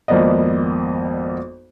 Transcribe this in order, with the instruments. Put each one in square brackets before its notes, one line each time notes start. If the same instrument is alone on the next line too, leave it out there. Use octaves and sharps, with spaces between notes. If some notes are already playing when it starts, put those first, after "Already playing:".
[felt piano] G#1 F2 A#3 B3 D5 D#5